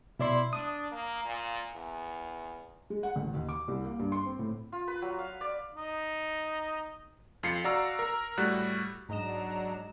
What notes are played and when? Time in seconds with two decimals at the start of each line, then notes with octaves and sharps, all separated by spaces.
0.20 B2 E4 D5 C6
0.53 D4 D#6
0.91 A#3
1.25 A#2
1.74 E2
2.90 G#3
3.03 F#5
3.16 A1
3.34 D#2
3.49 D6
3.68 C2
3.85 A#3
3.99 G2
4.12 C6
4.26 C4
4.39 A2
4.72 F4
4.88 B4
5.02 F#3
5.18 F5
5.41 D5
5.75 D#4
7.43 F2 F4 C7 C#7
7.64 F#4 D5 F5 A#5 E6
7.99 A#4 A#5
8.38 A2 G3 F#4 F#6
9.09 G#2 F#3 D4 D#5 A#5 E7